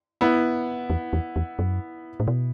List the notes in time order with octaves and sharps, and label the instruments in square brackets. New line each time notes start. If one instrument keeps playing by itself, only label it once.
[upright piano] B3 E4
[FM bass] E2
E2
E2
F#2
A2
B2